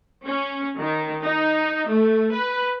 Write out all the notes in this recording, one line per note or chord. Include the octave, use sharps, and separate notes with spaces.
C#4
D#3
D#4
A3
B4